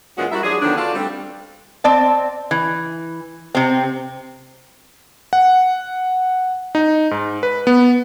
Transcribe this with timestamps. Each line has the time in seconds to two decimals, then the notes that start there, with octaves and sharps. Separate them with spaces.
0.18 A#2 E3 G#3 C#4 F4 F#4
0.32 G3 E4 F#4 A#4 E5
0.44 F3 F#3 D4 G#4
0.62 D3 D#3 F3 F#3 B3 D4
0.77 D4 F4 F#4 A4 D5 F5
0.95 G3 A3 C4
1.84 C4 D5 A5
2.51 E3
3.55 C3 C4
5.33 F#5
6.75 D#4
7.11 G#2
7.43 B4
7.67 B3